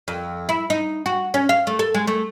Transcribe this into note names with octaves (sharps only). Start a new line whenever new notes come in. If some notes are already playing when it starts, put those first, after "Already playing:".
F2
E4
D#4
F#4
C#4
F5
A3
A4
G#3
A3